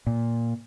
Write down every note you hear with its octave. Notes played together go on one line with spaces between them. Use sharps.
A#2